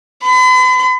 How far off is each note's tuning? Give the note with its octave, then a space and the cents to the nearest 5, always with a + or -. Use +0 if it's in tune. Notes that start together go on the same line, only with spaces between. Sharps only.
B5 +45